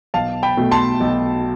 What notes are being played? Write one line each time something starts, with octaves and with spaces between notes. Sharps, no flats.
B1 F5 A5
G5 B5
B2 A3
A5 C6
B1